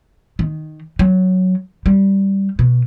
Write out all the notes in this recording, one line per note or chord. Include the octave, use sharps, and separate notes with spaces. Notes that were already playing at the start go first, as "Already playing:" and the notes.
D#3
F#3
G3
B2